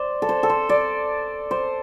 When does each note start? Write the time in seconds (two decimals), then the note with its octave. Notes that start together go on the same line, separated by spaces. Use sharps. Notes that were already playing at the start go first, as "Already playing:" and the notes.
Already playing: C5 D5
0.22 A4
0.29 C5
0.43 A4
0.50 C5
0.69 D5
1.51 C5